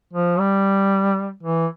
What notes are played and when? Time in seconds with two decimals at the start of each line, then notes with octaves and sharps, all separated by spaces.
0.13 F3
0.39 G3
1.43 E3